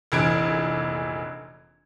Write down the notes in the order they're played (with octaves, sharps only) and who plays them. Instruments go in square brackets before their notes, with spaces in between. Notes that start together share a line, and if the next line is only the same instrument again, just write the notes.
[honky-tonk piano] F1 A#1 E3 G#6 D7